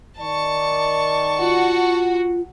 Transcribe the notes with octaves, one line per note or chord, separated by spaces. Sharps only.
D#3 D5 A5 C#6
F4 F#4